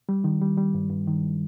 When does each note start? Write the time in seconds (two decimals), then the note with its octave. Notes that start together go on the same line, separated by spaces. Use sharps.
0.09 G3
0.24 D#3
0.41 G3
0.57 G3
0.74 G2
0.90 G2
1.07 D#3